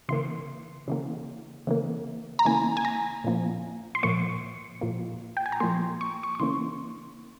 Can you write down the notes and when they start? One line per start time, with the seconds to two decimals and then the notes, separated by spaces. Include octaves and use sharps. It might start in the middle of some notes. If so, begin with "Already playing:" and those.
0.09 C#3 E3 A#3 C6
0.88 C#3 E3 A#3
1.67 C#3 E3 A#3
2.39 A#5
2.45 C#3 E3 A#3 G#5
2.77 G#5
2.85 A#5
3.24 A#2 F3 A#3
3.95 C6
4.03 A#2 F3 A#3 C#6
4.81 A#2 F3 A#3
5.37 G5
5.46 G#5
5.52 A#5
5.60 A#2 F3 A#3 C6
6.01 C#6
6.23 C#6
6.35 C#6
6.40 C#3 E3 A#3 C#4 C6